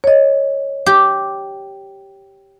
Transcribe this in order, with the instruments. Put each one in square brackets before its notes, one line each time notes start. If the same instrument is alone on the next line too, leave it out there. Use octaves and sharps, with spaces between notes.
[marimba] C#5 D#5
[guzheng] G4